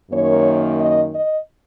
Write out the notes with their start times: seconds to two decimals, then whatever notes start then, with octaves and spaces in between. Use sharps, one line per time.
0.11 F#2 D#3 A#3 C#5
0.79 D#5
1.13 D#5